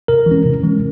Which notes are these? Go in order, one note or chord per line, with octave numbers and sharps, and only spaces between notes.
C3 A#4
E3 G#3 C#4
C3
E3 G#3 C#4